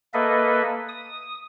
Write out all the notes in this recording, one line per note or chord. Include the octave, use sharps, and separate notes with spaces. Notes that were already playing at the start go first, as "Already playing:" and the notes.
A#3 A4 B4 D#5 E5
D#6